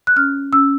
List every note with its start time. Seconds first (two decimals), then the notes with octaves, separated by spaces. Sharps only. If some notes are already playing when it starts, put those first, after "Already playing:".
0.07 F#6
0.16 C#4 F6
0.53 C#4 E6